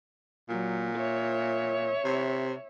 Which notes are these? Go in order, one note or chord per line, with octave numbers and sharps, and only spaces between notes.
A#2 F#3
C#5 E5
C3